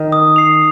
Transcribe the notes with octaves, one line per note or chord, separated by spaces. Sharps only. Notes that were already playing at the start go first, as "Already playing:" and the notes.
Already playing: D#3
D#6
C7 F7